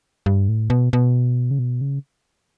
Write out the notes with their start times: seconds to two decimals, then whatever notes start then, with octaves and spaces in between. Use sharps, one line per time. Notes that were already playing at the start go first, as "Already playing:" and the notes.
0.26 G2
0.49 A2
0.70 B2
0.93 B2
1.51 C#3
1.59 B2
1.81 C#3